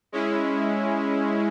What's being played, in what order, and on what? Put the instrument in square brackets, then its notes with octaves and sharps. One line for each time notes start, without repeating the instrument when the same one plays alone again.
[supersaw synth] G#3 C#4 E4